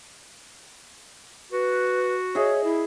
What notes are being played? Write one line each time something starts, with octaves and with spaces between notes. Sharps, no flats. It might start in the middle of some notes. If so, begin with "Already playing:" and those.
F#4 B4
G#4 C#5 D#5 E5
E4